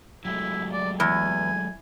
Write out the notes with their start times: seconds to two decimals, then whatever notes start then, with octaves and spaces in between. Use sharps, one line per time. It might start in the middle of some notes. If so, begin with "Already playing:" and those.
0.25 F#3 G#3 A3 E4
0.73 D5
1.00 E2 G#5